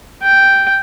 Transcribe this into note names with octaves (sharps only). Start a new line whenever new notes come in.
G5